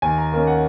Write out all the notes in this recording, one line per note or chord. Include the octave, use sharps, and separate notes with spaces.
D#2 G#5
A#5
D#3 A#3 C#4
F#5